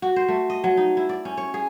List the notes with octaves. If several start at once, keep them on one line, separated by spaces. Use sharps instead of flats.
F#4
C5
A3
D#5
F#3
D#4
E4
D5
C#4
C#5
G#4